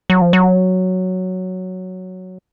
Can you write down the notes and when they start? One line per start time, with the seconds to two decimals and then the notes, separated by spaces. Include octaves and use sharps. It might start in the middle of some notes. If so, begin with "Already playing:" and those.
0.10 F#3
0.21 F3
0.33 F#3